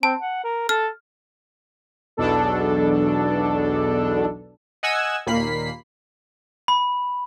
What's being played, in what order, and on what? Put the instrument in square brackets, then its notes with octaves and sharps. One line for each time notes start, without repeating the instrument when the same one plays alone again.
[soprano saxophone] C4 [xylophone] A5
[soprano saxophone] F#5
A#4
[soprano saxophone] A4 [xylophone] F6
[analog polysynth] B1 E2 B2 D4 A4
D#5 F#5 G#5 E6 G#6
D#2 A#2 A#3 B5 B6 C7
[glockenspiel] B5